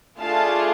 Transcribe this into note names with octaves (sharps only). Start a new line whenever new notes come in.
A3 D4 F4 G#4 F5 A5